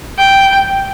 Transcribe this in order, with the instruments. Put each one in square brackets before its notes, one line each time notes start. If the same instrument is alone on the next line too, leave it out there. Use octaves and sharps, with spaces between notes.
[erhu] G5